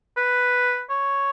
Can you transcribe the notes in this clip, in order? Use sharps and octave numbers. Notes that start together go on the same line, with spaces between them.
B4
C#5